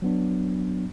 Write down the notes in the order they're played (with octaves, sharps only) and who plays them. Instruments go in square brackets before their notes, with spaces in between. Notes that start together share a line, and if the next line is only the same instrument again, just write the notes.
[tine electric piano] F#3 B3 D4